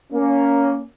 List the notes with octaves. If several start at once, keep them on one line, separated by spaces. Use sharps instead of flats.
A#3 C#4